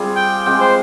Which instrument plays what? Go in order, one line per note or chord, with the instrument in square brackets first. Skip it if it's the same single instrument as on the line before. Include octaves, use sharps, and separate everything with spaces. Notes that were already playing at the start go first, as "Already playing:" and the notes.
Already playing: [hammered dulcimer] G3 C4 F4 G#4
[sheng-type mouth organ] G5
[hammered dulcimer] G#3 C4 G4 [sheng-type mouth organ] G5
[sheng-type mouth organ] C5